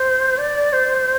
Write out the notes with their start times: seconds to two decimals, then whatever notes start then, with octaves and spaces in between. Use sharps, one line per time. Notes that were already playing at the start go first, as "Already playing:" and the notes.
Already playing: C5
0.37 D5
0.72 C5